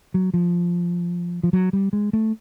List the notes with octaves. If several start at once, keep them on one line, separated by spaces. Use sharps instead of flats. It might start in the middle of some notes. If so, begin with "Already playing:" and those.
F#3
F3
F3
F#3
G3
G#3
A3